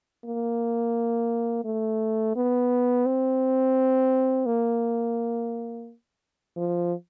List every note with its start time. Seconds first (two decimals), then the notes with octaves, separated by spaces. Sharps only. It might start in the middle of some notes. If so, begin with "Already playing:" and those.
0.25 A#3
1.65 A3
2.36 B3
3.06 C4
4.46 A#3
6.57 F3